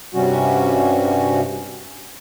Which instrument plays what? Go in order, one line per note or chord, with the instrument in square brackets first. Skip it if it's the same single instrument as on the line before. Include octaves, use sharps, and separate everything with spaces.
[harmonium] G2 C3 G3 C#4 F#4